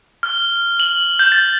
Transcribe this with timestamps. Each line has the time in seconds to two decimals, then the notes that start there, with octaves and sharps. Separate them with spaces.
0.23 F6
0.80 F#7
1.19 G6
1.32 A6